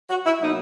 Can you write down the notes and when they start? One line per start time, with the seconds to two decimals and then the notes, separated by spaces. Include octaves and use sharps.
0.10 F#4
0.26 E4
0.41 B2 F#3 A#3 D#4